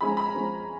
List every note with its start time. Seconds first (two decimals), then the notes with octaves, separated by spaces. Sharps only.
0.01 F3 G#3 C#4 B5
0.09 A#5
0.17 B5
0.26 A#5
0.34 F3 G#3 C#4